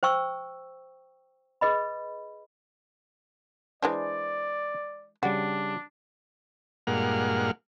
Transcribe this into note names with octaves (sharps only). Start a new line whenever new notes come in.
C5 G5 C#6 E6
G#4 B4 D#5 B5
E3 G#3 D4 C5 D5
C#3 G3 D4 F#4
G2 A#2 G#3 A#3 F#5 F6